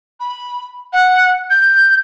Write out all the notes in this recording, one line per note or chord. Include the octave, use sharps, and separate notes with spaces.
B5
F#5
G6